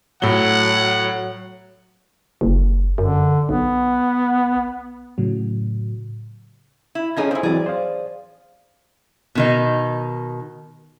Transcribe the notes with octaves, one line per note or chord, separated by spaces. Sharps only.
A2 F#3 F#5 G7
F#1
F#2 D3
B1 B3
A2 C#3 F#3
E4
F3 C#4 D#4 G#4 A4 G#6
C4 E4 C5 D#5 G#5
E3 F#3 C4 G#4 D5
C5 F5
B2 D#3 D#4